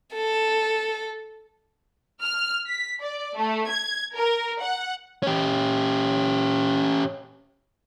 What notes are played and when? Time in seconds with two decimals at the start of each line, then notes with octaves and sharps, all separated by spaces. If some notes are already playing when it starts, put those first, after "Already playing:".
0.13 A4
2.22 F6
2.68 B6
3.00 D5
3.36 A3
3.69 G#6
4.14 A#4
4.60 F#5
5.23 C#4 G4